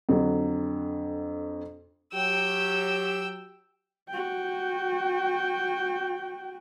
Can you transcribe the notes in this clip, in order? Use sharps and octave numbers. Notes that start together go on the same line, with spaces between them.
F2 D3 F#3
F#3 G4 G5 E6
F#4 G5